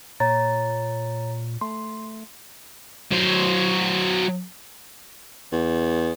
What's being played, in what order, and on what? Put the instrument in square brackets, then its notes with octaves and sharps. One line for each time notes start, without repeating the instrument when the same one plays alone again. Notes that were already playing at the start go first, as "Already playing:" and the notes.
[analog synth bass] A#2 [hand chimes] C#5 A#5 A6
[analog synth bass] A3 [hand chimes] C6
[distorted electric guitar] F#3 C5
[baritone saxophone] E2